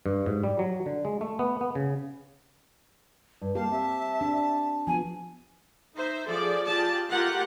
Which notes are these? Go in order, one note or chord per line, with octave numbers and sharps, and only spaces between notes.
G2
G#2
G3
F#3
D3
G#3
A3
B3
B3
C#3
G2
G3 A#3 G4 F5 A5
C4 E5
D4
F3 B3 F#4 G#5
D#4 C5 E5
F3 G#4 A4 D5
F4 G4 G#4 D5 A5
A3 F4 G4 A#4 F#5